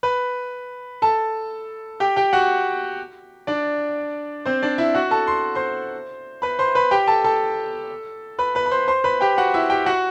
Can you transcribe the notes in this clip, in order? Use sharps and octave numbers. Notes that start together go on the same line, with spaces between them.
B4 B5
A4 A5
G4 G5
G4 G5
F#4 F#5
D4 D5
C4 C5
D4 D5
E4 E5
F#4 F#5
A4 A5
C6
C5 C6
B4 B5
C5 C6
B4 B5
G4 G5
A4 A5
A4 A5
B4 B5
B4 B5
B5
C5 C6
C5 C6
B4 B5
G4 G5
F#4 F#5
E4 E5
G4 G5
F#4 F#5